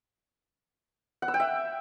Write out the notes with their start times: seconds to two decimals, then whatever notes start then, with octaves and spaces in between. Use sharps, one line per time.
1.22 F#5
1.28 E6
1.34 G5
1.40 E5